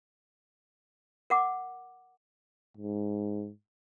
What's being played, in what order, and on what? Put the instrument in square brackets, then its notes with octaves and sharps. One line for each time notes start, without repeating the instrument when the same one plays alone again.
[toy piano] A#4 F#5 D6
[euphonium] G#2